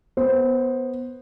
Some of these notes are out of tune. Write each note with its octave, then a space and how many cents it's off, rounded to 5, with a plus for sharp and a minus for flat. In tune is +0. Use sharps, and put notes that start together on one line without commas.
B3 +0 C5 +10